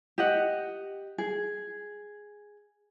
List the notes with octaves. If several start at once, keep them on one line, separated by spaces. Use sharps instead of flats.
G4 D#5 F#5
G#4